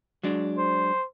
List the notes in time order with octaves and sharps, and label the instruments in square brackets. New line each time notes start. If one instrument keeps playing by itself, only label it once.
[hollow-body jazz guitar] F#3 G#3 D4
[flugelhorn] C5